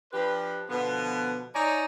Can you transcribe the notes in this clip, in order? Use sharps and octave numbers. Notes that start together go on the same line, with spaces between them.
F3 D4 G4 B4
B2 D3 F3 B3
D#4 C#5 D5 G#5 A#5